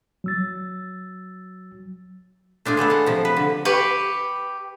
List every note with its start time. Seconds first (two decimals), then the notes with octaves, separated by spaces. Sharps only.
0.24 F#3 E6 A6
2.65 A3 D4 F4 G#4
2.77 G#3 A3 B3 A4
2.90 F5 F#5
3.06 C3 F3
3.25 B4
3.37 D3
3.65 G4 B4 B5 C#6